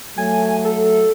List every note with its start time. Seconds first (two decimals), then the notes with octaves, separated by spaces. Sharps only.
0.18 F#3 A3 G#5
0.65 A4